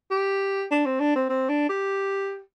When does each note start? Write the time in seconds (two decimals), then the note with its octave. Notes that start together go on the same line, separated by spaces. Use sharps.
0.11 G4
0.71 D4
0.85 C4
1.00 D4
1.16 C4
1.30 C4
1.49 D4
1.69 G4